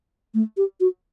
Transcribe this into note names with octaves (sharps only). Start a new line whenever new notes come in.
A3
G4
F#4